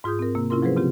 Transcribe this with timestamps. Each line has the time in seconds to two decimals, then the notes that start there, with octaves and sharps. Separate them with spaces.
0.04 G#2 F4 G#4 D#6 G6
0.19 C4 A#4
0.35 C3 A#3
0.50 C3 C#4 E4 F4 A#4 C6
0.62 F3 F#3 G#4 B4 C5
0.76 C#3 C4 F4 G4